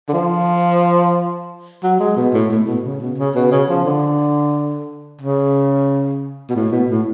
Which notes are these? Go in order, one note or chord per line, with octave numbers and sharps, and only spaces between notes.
D3
F3
F#3
G#3
B2
A2
A2
B2
C#3
B2
C#3
B2
C#3
F3
D3
C#3
B2
A2
B2
A2